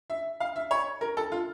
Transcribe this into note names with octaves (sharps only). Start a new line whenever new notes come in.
E5
F5
E5
C#5
A#4
A4
F4